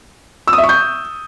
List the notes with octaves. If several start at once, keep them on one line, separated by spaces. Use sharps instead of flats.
E6
D#6
E5
C#6
G6